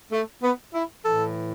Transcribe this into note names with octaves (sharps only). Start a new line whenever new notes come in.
A3
B3
E4
A2 E3 A4